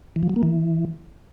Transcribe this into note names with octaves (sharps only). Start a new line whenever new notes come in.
E3
F3
F#3
A#3
E3